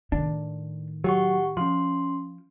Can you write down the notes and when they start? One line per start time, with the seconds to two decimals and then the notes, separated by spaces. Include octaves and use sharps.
0.12 A2 D#3 D4
1.04 F#3 G4 F#5 C#6
1.57 F3 C#4 C6